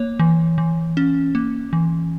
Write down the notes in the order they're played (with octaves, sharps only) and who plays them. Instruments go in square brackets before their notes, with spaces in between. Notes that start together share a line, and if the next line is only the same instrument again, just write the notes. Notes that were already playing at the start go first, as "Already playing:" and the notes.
Already playing: [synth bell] A#3 C#5
E3
E3
C#4
A#3
E3